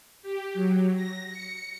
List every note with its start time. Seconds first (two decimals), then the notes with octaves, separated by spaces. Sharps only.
0.23 G4
0.54 F#3
0.96 A#6
1.31 C#7